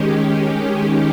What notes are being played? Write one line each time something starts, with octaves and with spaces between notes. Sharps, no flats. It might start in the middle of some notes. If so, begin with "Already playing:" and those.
Already playing: D#3 G#3 C#4 G4
G4